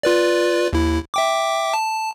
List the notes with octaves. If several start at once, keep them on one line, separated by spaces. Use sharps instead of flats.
F4 B4 D5
D#2 E4
E5 G5 D6
A5